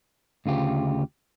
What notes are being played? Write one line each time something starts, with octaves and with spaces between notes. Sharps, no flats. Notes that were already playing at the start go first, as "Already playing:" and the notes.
D2 C#3 F4 G4